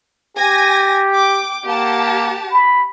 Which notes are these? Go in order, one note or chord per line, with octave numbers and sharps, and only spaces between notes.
G4 G#5 A#6
G5 D6
A#3 G4 F#5 A5
B5